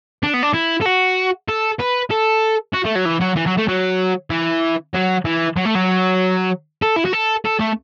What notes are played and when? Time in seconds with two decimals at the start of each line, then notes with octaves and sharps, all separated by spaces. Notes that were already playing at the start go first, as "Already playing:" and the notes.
0.23 D4
0.34 B3
0.43 D4
0.54 E4
0.81 A4
0.86 F#4
1.49 A4
1.80 B4
2.11 A4
2.74 F#4
2.85 A3
2.95 F#3
3.06 E3
3.21 F#3
3.36 E3
3.47 F#3
3.58 A3
3.68 F#3
4.30 E3
4.94 F#3
5.25 E3
5.57 F#3
5.65 A3
5.75 F#3
6.82 A4
6.96 E4
7.05 F#4
7.13 A4
7.45 A4
7.60 A3